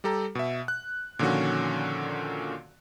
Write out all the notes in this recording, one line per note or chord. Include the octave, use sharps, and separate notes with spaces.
G3 G4 A4 A#5
B2 E5
F#6
A#2 D3 D#3 F3 C#4 F#4